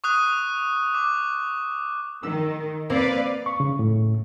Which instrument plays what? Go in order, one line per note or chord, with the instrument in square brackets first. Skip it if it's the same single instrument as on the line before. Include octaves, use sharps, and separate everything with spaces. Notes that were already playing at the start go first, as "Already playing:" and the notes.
[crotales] C#6 D#6 F#6
D6
[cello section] D#3 [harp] E6
[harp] A#3 C4 [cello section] B4 D5 F5
[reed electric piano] C#6
C#3
A2